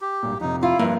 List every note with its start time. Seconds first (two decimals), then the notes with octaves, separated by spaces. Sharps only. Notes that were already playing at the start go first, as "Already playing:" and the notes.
0.01 G4
0.23 G#1 G2 A#2
0.41 F2 C3 D#4
0.63 E4 F4
0.79 G2 F3 A#3